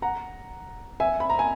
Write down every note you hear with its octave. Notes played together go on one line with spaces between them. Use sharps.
F#5 A#5
E5 G#5
B5
A#5
G#5